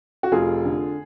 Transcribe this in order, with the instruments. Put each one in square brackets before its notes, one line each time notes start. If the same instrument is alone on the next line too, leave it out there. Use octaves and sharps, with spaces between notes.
[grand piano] F#4
F1 F4 G#4
D3